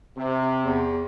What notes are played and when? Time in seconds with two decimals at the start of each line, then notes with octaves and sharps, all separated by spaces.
0.17 C3
0.63 E2